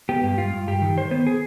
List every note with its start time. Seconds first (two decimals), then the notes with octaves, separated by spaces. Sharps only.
0.09 B3 G4
0.23 G2 G4
0.37 G2 F4
0.53 G2
0.68 G2 G4
0.82 D#3
0.97 D#3 C5
1.11 B3 C5
1.27 G#4